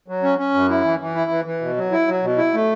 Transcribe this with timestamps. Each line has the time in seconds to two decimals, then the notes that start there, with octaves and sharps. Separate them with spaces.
0.08 F#3
0.23 C#4
0.39 C#4
0.54 F#2
0.69 E4
0.84 E3
1.00 E3
1.15 E4
1.31 E3
1.46 E3
1.61 B2
1.77 F#3
1.92 E4
2.07 F#3
2.23 B2
2.37 E4
2.54 A3